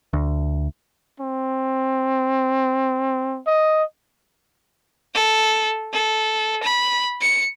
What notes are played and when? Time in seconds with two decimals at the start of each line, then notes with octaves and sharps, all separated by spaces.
0.13 D2
1.20 C4
3.47 D#5
5.14 A4
5.93 A4
6.63 B5
7.21 C#7